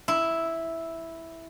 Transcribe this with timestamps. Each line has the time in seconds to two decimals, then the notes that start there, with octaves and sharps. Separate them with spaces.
0.08 E4